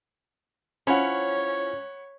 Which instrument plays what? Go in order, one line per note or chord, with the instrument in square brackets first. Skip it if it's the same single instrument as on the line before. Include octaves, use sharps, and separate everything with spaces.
[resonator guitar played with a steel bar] C#4 [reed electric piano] E4 F4 C5 [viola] C#5 [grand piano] F#5 B5